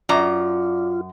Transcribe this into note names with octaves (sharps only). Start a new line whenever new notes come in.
F#2 F4 D5 A#5 D6